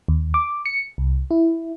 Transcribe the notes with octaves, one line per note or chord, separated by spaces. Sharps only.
D#2
D6
C#7
C2
E4